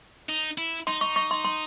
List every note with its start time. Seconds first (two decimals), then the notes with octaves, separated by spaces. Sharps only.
0.29 D#4
0.58 E4
0.87 D#4 C6
1.01 C#6
1.16 C#6
1.31 C6
1.45 C6